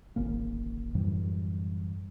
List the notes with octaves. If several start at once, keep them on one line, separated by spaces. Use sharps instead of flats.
D1 G#1 C#3 A#3
F#2 A2 E3 G3